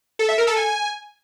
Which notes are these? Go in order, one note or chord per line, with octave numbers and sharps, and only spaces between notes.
A4
E5
A#4
A4
G#5